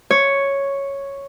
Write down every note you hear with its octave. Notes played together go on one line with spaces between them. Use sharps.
C#5